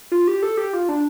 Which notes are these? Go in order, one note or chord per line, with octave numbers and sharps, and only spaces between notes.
F4
G4
A4
G4
F4
D4